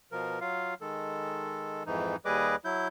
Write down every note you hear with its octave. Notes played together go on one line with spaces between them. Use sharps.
B2 F3 A#4
F#3 F4 F5
D#3 G#3 A4
F2 G#2 E3 D#4
D#2 G3 G#4 B4 D#5 D6
F#3 E4 G6